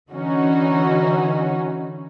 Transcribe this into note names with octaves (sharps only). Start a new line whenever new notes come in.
D3 E3 C#4 D#4 F#4